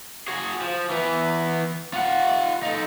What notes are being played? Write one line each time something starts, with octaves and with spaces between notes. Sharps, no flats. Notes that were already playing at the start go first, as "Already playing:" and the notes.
F#4 G#4
F3
E3 B3
F4 F#5
D#4 A4